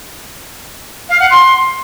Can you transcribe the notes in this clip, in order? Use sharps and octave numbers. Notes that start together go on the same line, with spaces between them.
F5
F#5
C6